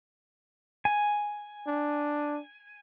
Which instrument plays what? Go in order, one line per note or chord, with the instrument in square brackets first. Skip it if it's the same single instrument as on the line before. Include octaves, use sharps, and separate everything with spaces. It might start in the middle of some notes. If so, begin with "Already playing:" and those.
[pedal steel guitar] G#5
[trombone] D4